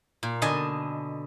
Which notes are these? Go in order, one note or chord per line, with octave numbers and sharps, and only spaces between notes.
A#2
B2 D3 D#5 G#5 A5